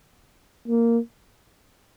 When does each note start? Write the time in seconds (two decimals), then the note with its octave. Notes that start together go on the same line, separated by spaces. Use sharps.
0.68 A#3